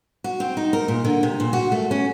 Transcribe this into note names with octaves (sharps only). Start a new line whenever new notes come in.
F#4
C4
D#4
A#4
A#2
D3
C3
A#2
F#4
A3
C#4